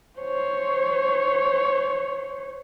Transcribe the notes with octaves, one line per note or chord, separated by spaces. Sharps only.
C5 C#5